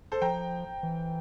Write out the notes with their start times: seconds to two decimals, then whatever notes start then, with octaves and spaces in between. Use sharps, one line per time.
0.12 A4 C5
0.22 F3 G5 A#5
0.83 E3